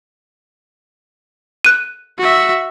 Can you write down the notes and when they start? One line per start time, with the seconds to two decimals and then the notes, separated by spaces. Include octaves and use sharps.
1.65 F#6 D#7
2.18 F#4 E5